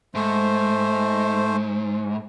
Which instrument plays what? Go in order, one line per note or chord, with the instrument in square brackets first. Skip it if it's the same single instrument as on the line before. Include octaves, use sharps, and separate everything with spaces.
[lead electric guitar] G#2 [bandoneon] A3 C5